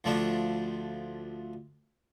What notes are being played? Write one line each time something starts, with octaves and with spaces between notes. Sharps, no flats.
D2 F3 A3 D4 A5